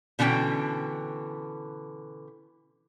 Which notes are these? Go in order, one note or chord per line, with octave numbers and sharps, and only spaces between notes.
B2 D3 E3 C#4 G5